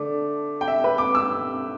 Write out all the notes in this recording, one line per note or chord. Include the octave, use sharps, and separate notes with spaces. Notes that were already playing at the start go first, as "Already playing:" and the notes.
Already playing: D3 A3 D5
G5
E5
B4
D6
E6